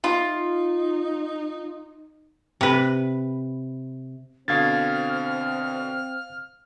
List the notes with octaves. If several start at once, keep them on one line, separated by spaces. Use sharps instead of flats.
D#4 F4
C3 B4
B2 D3 C4 F5 F6 G#6 A6